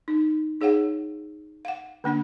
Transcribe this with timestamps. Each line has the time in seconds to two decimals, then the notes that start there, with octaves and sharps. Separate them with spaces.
0.08 D#4
0.61 D#4 G#4 C#5 F5 F#5
1.65 F5 F#5
2.04 D3 A#3 D4 F#5